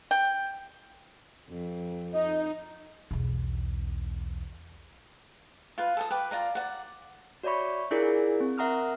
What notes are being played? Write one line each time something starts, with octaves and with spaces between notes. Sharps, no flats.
G5
F2
D#4 D#5
B1 E2
F4 B4
A4 G5 D#6
B4 G5 D6
F4 D5 A#5
D5 F#5
F#4 C#5 D5 E5 B5 C#6
D4 E4 F4 G#4 A#4 D5
C4
A#4 E5 F#5 A#5 D#6 F6